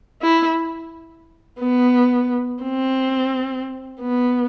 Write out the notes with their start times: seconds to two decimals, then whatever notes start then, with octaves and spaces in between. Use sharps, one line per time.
0.22 E4
1.59 B3
2.63 C4
4.01 B3